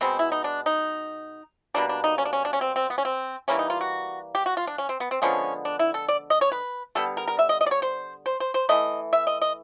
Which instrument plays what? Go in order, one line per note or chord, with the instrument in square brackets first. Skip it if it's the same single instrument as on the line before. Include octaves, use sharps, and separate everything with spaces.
[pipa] B2 G#3 B3 C4
E4
D#4
D4
D#4
B2 G3 A#3 D4
D4
D#4
C#4
D4
C#4
D4
C#4
C4
C4
B3
C#4
C4
E3 G3 A#3 C#4
D#4
F4
F#4
G4
F#4
F4
D4
C#4
C4
B3
C4
D3 F3 G#3 B3 C#4
D4
E4
A4
D5
D#5
C#5
B4
D3 G3 B3 A4
A#4
A#4
E5
D#5
D#5
D5
C#5
C5
C5
C5
C5
E3 A3 D#5
E5
D#5
D#5